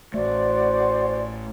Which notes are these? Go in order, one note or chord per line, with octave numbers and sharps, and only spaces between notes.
A1 A3 F#4 C5 D5